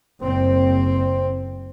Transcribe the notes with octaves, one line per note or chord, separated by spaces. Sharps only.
F#1 C4